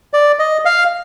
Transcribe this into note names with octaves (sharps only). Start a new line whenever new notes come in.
D5
D#5
F5